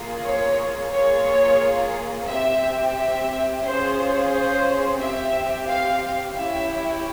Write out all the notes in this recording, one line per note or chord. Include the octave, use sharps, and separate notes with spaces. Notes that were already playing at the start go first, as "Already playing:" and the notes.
Already playing: A#3 F4 G#4
C#5
A#3 F4 G#4 C#5
C4 G4 E5
E5
C#4 F4 G#4 C5
C5
C4 G4 E5
F5
C#4 E4 G4 E5